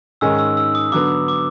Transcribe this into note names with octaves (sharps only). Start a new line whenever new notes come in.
G#2 D#3 G#3 C#4 E6
E6
E6
D#6
D3 F#3 B3 D6
D6